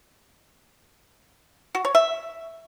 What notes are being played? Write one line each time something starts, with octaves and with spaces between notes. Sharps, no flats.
F#4
C#5
E5